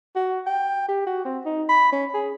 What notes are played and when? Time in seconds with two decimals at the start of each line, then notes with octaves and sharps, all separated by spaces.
0.16 F#4
0.47 G5
0.89 G4
1.07 F#4
1.25 C4
1.46 D#4
1.69 B5
1.92 C#4
2.14 G#4